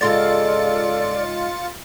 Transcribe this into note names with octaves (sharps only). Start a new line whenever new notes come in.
G#2 C#3 G#3 F4 A4 D5 A6 C#7